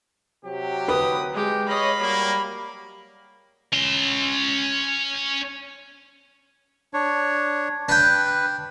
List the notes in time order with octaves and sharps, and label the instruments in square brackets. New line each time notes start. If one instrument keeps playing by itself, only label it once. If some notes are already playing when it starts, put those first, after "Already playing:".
[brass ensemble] C3 F#3 G4
[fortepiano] B4 [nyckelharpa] D#6
[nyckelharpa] G#3 G4
[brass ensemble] C#5 D#5 [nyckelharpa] F5 B5
[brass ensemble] F#3 G3 A#3
[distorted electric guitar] C#4 C6
[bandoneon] D4 C#5
[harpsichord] D4 G5 [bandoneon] B4